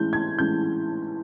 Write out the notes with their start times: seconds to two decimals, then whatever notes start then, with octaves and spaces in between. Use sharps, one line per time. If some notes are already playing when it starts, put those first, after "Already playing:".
Already playing: A2 E3 G#3 C#4 G6
0.13 G#6
0.39 A2 E3 G#3 C#4 G6